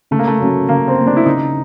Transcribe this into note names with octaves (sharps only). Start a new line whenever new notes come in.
C#3 A3
A#3
A3
F#3 A#3 C#4
C#3 A#3
C4
F#3 A#3 C#4
D4
E4
C#3 D#4